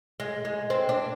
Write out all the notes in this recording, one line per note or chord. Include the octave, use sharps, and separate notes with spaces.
G#3
G#3
C4
D4